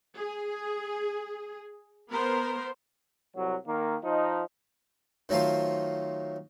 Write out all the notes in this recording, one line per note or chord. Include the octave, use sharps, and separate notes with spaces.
G#4
B3 A#4 C5
C2 F#3
D#3 A#3
F3 D#4
D#3 F#3 A3 F4 C5